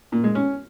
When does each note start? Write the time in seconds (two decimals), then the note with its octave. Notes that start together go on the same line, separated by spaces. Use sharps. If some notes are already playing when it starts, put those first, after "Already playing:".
0.12 A#2
0.24 G#3
0.35 C#4